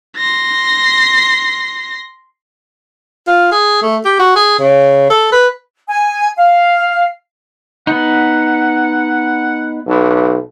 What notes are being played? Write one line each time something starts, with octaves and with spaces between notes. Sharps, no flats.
C6 A#6
F4
G#4
A3
G4
F#4
G#4
C#3
A4
B4
G#5
F5
B3 D#4 F#5
B1